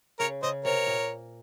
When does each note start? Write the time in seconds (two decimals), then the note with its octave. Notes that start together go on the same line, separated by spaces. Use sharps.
0.20 C#3 A#4 C#5
0.42 C#3 C5 D#5
0.65 C3 A#4 C#5
0.87 A#2